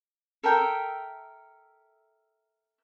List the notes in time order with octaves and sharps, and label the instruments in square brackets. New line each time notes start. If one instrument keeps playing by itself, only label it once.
[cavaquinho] A4 A#4 E5 G5